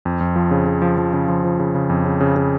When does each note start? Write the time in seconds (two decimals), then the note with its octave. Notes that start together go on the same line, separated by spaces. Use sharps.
0.05 F2
0.21 F2
0.36 F3
0.51 C#3
0.66 C#3
0.82 F3
0.98 F3
1.13 C#3
1.28 F3
1.44 F3
1.59 C#3
1.75 C#3
1.90 F2
2.05 C#3
2.21 C#3
2.36 C#3